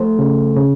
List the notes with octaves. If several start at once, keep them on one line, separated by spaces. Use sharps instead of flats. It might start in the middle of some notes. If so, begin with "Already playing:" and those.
Already playing: F3 A3 A4 C5
C#3
C#3